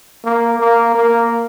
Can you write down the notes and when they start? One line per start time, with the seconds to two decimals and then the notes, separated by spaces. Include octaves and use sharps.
0.25 A#3
0.59 A#3
0.95 A#3